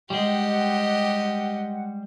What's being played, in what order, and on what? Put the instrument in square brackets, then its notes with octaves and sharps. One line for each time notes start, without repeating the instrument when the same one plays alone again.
[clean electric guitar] G3 G#3 [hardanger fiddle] G4 D#5 [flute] F#5